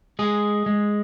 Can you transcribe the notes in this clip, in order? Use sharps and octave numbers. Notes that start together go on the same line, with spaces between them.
G#3 G#4
G#3